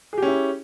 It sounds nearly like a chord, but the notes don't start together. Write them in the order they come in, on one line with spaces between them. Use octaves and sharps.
G#4 G4 C#4 E4